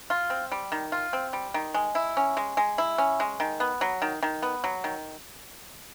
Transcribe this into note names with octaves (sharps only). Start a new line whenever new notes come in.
F4
C4
G3
D#3
F4
C4
G3
D#3
G#3
E4
C#4
G#3
G#3
E4
C#4
G#3
D#3
B3
F#3
D#3
D#3
B3
F#3
D#3